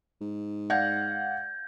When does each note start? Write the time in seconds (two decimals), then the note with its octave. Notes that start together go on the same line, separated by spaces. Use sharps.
0.21 G#2
0.70 D5 F5 F#5 G6 G#6 A#6